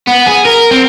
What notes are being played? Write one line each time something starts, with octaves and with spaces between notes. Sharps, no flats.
B3
G#4
A#4
C4